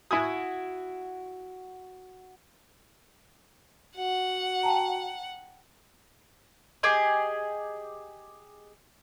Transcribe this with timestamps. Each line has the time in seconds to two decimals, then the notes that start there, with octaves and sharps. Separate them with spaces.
0.11 E4 F#4 G#5 D#6
3.97 F#4 F#5
4.63 G5 A5 A#5
6.83 G4 G#4 D#5